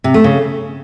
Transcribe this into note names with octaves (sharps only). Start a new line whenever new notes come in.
C3
A3
C#3